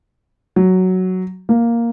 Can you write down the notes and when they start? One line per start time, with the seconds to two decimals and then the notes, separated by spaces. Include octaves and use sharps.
0.56 F#3
1.49 A#3